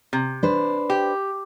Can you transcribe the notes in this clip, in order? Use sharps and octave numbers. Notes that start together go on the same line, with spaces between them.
C3
D4 B4 C5
G4